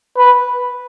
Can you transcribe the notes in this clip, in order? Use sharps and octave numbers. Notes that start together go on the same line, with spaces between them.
B4